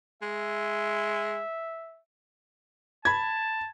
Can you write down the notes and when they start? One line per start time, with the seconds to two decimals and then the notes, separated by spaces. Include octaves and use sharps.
0.22 G#3 E5
3.05 A5 B5 G#6